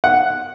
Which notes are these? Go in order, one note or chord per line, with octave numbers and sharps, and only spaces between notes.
F#5